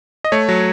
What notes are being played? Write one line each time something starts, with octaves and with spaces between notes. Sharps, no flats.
D#5
A3 C#5
F#3